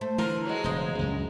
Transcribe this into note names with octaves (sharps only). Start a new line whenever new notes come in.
A3 C5
D3 E3 F4 A#4
F#3 G#3
E1 G2 C#3 C5 D#5
C#2 F#2 A2